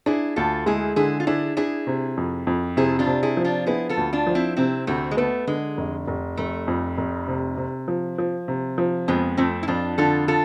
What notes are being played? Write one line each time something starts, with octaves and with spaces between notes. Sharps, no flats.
D4 E4 G#4
D2 F4 A4
G#3 E4 G#4
D3 E4 G#4
F4
D4 E4 G#4
D4 E4 G#4
C3
F2
F2
C3 E4 G#4
D4 F4
C3
E4 G#4
F3
D4 F4
B3 E4 G#4
F4 A4
D2
D4 F4
F3
C4 E4
C3 C4 E4
D2 A3 C4
G#3
A3 B3
D3 G#3
F1
F1
F1 A3
F2
F1
C3
C3
F3
F3
C3
F3
F2 G#3 B3
F2 A3 C4
E4
F2 D4 F4
D3 F4 A4
F4 A4